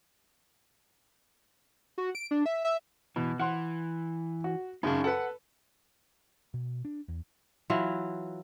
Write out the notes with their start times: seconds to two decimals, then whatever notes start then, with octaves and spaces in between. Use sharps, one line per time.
1.98 F#4
2.15 D7
2.31 D4
2.46 E5
2.65 E5
3.16 B2 E3
3.40 E3 F#5 C6
4.44 F#4
4.83 F#2 C#3 D#4 A5
5.04 A4 B4 F#5
6.54 B2
6.85 D4
7.08 E2
7.70 E3 F#3 E4 F4